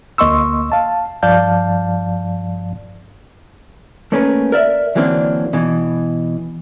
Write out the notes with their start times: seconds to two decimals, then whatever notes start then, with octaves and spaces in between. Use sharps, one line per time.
0.18 D2 A#3 D#5 C6 C#6 E6
0.72 F5 A5
1.23 G2 F3 D5 F5 A5 G6
4.12 A3 A#3 C#4 A#4 B4
4.52 A#4 D5 E5
4.95 D3 E3 F#3 A#3 C4 D4
5.53 B2 E3